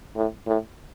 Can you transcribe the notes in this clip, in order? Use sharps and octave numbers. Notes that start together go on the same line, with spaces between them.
A2
A2